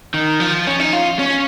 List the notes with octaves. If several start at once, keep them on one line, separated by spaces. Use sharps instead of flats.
D#3
F3
C#4
D#4
F4
C#4